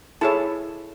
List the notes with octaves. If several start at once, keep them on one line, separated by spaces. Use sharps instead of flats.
E4 G#4 A4 C#5 A5